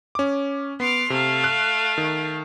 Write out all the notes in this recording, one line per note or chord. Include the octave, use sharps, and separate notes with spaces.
C#4 D6
B3 C6 D6 F6
C3 A3 F5
F#6
D#3